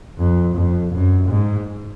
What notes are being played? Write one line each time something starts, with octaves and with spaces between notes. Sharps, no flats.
F2
F2
F#2
G#2